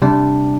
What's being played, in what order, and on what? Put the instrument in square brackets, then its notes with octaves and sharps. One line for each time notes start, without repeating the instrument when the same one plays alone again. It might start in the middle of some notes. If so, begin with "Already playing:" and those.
[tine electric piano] C3 G3 D4